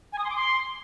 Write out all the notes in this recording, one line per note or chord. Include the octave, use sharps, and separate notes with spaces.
G#5
D#6
C6
D6
C6